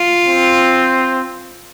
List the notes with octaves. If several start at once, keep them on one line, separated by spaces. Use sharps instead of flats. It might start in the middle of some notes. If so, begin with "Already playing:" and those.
Already playing: F4
C4